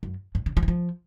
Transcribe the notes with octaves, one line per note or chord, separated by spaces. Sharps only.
F#2
G2
C#3
F3
E3
F3